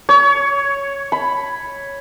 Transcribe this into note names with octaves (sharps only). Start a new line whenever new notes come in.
C#5
B5